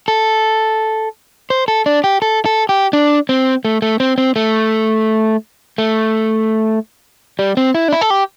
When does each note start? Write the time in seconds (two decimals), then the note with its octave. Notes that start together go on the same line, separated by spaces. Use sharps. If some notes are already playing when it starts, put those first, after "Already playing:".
0.08 A4
1.50 C5
1.68 A4
1.86 D4
2.04 G4
2.22 A4
2.45 A4
2.69 G4
2.93 D4
3.29 C4
3.65 A3
3.82 A3
4.00 C4
4.18 C4
4.36 A3
5.78 A3
7.39 G3
7.57 C4
7.75 E4
7.88 D4
7.93 E4
8.01 A4
8.10 G4